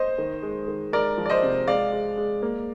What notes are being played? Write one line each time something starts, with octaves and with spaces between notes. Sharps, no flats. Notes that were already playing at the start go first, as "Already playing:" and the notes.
Already playing: C5 D#5
D#3
G#3
D#3
G#3 A#4 D5
F3
D5
C5 D#5
C3
G#3 D5 F5
G#3
G#3
A#3